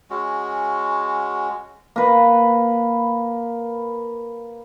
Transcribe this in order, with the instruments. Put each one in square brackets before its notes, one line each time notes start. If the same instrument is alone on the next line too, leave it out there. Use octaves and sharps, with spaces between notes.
[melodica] G#3 C#4 F#4
[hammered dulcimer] A#3 B4